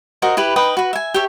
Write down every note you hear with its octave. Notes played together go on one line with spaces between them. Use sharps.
F#4 A#4 C5 D#5
E4 G4 B4
D#4 B4 G5 D#6
F#4 B4
E5 G#5
G4 A4 C#5 E5